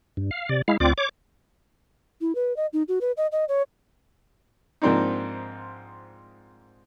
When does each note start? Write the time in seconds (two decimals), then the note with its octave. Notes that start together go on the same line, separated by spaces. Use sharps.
0.17 G2
0.31 F5
0.49 C3 D5
0.68 G#3 E4 F5
0.80 D2 C4 F4 D5 D6
0.98 C#5 D6
2.21 E4
2.35 B4
2.56 D#5
2.73 D#4
2.88 F#4
3.01 B4
3.17 D#5
3.32 D#5
3.48 C#5
4.82 G#2 F3 A#3 C4 D4 D#4